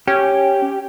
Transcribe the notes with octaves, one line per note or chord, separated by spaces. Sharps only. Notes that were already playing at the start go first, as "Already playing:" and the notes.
C#4 G4